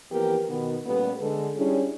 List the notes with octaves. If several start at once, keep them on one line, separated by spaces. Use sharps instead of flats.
E3 F3 A#3 B3 G4 A#4
B2 D#3 B3
A#2 C#3 G3 A3 B3
D3 G#3 A4
G3 C#4 D4 E4 G#4